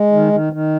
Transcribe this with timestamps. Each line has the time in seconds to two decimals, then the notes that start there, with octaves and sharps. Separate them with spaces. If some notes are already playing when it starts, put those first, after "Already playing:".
Already playing: G#3
0.12 D#3
0.33 D#3
0.53 D#3